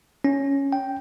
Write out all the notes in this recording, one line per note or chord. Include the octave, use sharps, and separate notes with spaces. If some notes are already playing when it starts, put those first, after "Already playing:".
C#4
G5